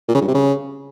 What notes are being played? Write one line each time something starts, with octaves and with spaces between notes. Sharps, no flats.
A#2
C#3
G2
C3
C#3